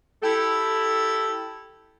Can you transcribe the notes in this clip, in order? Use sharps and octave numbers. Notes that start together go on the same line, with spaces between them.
E4 G4 A4